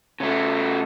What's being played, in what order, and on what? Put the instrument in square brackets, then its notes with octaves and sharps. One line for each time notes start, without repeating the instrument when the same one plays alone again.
[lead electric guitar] C#3 A3